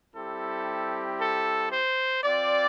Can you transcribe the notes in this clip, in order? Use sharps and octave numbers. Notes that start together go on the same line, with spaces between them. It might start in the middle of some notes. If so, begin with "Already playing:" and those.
G3 C4 E4 G4 A4
A4
C5
C4 F4 D5